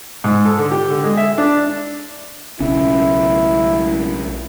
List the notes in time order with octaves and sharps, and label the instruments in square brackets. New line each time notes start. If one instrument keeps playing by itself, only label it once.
[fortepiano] G#2
A4
D3
G4
D3
G#3
E5
D4
[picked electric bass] B1 C#3 C#4 [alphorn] E4